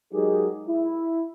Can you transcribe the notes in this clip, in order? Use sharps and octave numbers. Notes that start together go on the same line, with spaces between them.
F#3 G#3 D#4 G4 G#4 A#4
E4